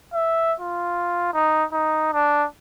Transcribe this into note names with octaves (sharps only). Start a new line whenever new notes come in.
E5
F4
D#4
D#4
D4